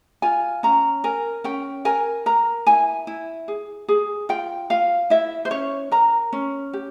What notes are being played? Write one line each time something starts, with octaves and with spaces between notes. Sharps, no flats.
F4 G#5
C#4 A#5
A#4 G#5
C#4 G5
A#4 G#5
A#4 A#5
E4 G#5
E4
G#4
G#4
F4 G5
F4 F5
E4 E5
C5
C#4 C#5
A#4 A#5
C#4
G4